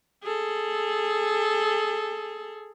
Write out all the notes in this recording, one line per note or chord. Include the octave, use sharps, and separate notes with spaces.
G#4 A4